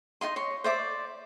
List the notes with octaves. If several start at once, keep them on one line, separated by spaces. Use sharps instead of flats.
D#4 F4 D#5 C6
C#5 C6
C5 D5 E5 D6